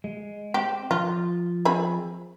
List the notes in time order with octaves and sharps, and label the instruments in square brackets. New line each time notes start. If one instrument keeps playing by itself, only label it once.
[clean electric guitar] G#3
[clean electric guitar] C4 [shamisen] G4
[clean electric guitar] F3 [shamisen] F4
[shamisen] C4 G#4 B5